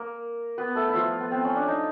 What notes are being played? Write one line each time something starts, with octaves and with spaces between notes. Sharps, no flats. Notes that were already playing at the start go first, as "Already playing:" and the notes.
Already playing: A#3 A#4
B3 B4
A3 A4
E4
F3 F4
B3
C4
C#4
D4
D#4